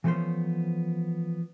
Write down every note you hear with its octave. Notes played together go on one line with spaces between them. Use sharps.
E3 F3 A3 B3 C#4 C5